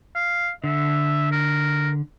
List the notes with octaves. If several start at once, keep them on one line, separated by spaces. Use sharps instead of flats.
F5
D3 E5
A#4